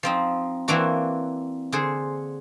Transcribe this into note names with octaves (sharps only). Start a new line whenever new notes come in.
F3 C4 D#4
E3 A#3 C4 D4 F#4
D3 G#4 C5